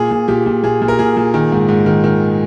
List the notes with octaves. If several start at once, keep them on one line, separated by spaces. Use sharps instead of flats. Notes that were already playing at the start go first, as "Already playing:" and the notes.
Already playing: A#2 G#4
A#2
A#2 G4
A#2
A#2 G#4
A#2
A#4
A#2 G#4
A#2
D#3
G#2
G#2
D#3
D#3